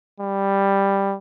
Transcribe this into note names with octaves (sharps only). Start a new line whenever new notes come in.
G3